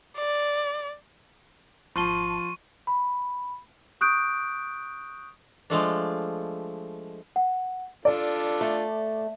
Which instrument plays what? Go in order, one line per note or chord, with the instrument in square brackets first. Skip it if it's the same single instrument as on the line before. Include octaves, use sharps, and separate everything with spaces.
[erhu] D5
[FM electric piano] G#1 A5 [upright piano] F3 [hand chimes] C6 [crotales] C#6 D#7 G7
[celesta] B5
C#6 D#6 F#6 G6 D7
[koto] F3 G#3 A3 D4
[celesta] F#5
[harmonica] D4 F4 A4 [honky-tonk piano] D5
[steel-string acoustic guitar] A3